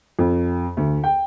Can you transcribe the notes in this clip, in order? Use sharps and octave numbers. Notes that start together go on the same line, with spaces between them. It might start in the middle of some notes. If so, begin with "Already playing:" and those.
F2
D2
G5